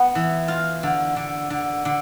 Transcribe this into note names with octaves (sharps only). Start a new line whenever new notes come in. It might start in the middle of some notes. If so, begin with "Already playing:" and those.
Already playing: B3
E3
F4
D3
D3
D3
D3